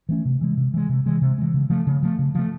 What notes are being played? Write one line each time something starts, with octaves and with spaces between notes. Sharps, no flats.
E3 A3 C#4
C3
E3 G#3
C3
E3 G#3
C3
E3 G#3
C3
E3 G#3
C#3
F3 A3
C#3
F3 A3
C#3
F3 A3